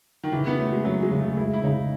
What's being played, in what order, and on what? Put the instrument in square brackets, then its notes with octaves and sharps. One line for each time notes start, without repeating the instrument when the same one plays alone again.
[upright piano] D#3
[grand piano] C#3 [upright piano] E3
[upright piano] B3
[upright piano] A3 [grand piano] C#4
[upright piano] G#3
[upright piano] F#3 [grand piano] C#4
[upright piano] G#3
[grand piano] C#3
[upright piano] A3
[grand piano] G#3 [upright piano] E4
[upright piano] E4
[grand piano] C#3 [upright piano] D#4